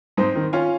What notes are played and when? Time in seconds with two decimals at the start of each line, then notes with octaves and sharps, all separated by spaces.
0.17 G#2 C4 D#4
0.36 D#3
0.53 C#4 F4